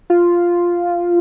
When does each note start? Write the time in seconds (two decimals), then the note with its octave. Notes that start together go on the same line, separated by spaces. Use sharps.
0.10 F4